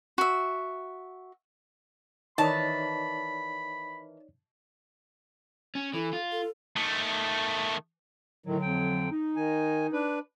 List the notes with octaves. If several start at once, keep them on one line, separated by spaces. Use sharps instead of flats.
F#4 E5
D#3 E3 D#4 C#5 D5 A5 B5
C#4
E3 A4
F4
A4
D#3 A3
A2 D3 D#3 F#3
F2 G5
D#4
D#3 G#5
D4 B4